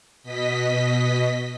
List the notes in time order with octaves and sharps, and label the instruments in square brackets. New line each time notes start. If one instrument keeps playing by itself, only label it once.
[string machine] B2 D#5 B6